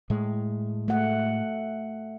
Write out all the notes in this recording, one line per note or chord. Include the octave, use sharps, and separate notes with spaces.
A2 G#3
A3 F#5